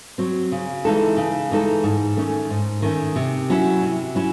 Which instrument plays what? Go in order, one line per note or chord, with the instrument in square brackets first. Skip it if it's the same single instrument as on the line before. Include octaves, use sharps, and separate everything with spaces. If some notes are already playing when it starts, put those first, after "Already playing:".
[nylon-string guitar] F#3 C4
C#3
E3 G#3 D#4 A4
C#3
E3 G#3 D#4 A4
G#2
D#3 A3 C#4
G#2
D#3 A3 C#4
C3
F#3 C#4 E4
C3
F#3 C#4 E4